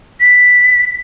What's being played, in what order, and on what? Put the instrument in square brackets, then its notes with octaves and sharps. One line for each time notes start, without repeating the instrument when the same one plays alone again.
[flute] B6